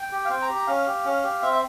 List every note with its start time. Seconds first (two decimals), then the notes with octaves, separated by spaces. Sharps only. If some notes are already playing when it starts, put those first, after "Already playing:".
Already playing: G5
0.12 G4
0.25 F5
0.29 C4 G5
0.42 A#5
0.49 G4
0.55 A#5
0.67 C#4 F5
0.87 G4
1.05 C#4
1.24 G4
1.42 C4 E5
1.53 E5